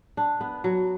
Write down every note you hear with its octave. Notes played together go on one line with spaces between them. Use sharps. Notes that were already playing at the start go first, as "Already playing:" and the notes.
D4
B3
F#3